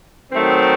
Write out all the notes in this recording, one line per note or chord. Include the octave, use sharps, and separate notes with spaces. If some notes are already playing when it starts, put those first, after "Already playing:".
D#3 F#3 A3 C4